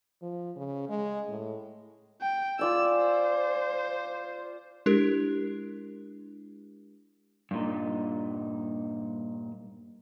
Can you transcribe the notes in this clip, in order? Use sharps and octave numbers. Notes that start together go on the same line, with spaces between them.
F3
C#3
G#3
A2
G5
F4 D5 G#5 E6
C5
G#3 D4 E4 G4 A#4
G2 A#2 D#4